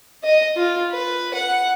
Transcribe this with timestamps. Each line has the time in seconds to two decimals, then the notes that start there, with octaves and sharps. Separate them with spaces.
0.23 D#5
0.57 F4
0.91 B4
1.34 F#5